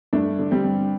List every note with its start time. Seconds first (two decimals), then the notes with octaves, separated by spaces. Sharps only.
0.13 G2 A3 D4
0.39 D3
0.51 G3 C4
0.64 G2